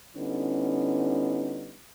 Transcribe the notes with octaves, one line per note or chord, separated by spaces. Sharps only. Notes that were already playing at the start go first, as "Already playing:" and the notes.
D3 G3 B3 C#4 D#4 E4